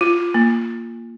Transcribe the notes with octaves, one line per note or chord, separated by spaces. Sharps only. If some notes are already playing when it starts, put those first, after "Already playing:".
F4
A#3